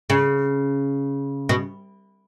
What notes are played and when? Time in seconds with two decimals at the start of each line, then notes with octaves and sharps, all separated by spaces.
0.10 C#3
1.49 B2